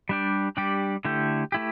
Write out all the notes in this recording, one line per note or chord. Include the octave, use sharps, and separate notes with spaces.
G3 D4 G4 D5
G3 D4 G4 D5
D3 A3 E4 G4
A3 E4 G4